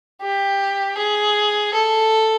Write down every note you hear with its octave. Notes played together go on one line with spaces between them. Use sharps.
G4
G#4
A4